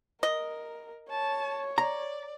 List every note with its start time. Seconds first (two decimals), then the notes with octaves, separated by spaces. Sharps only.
0.23 A#4 D#5
1.10 C#5 A5
1.78 D5 A#5